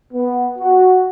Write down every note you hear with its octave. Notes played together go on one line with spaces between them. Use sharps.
B3
F#4